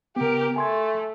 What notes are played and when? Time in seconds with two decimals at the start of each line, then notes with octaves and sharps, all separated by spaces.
0.16 C#3 B3 G4 A#4
0.56 A3 G#5 C6 G#6